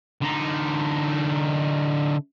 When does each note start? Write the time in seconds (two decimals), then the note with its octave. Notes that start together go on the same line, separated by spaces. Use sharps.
0.22 D3 D#4